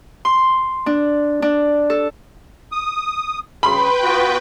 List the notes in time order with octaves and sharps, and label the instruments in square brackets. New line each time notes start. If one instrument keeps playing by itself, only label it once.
[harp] C6
D4
D4
A4
[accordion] D#6
[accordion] C#3 [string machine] B4 G5 [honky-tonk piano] B5 C6
[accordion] B3 F4 F#4